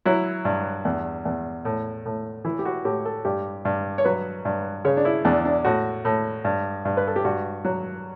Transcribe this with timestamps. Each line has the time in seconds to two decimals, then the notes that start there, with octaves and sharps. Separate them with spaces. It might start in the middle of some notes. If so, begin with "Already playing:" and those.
0.05 F#3 E4
0.45 G2
0.85 E2
1.25 E2
1.65 A2
2.05 A2
2.45 E3 E4
2.59 G4
2.65 F#4
2.85 A2 G4
3.05 A4
3.25 G2 G4
3.65 G2
3.98 C#5
4.05 F#3 B4
4.45 G2
4.85 C#3 C#5
4.97 D4
5.05 E4
5.25 E2 D4
5.45 D4
5.65 A2 F#4
6.05 A2
6.45 G2
6.85 G2
6.97 B4
7.07 A4
7.16 G4
7.25 G2 F#4
7.65 F#3